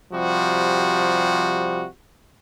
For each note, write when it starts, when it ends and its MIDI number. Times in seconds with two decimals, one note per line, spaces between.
0.13 1.85 48
0.13 1.85 53
0.13 1.85 55
0.13 1.85 66